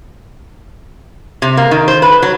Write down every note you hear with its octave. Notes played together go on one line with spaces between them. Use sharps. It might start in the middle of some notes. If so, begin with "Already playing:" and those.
C3
A#3
D#3
C5
B4
F#3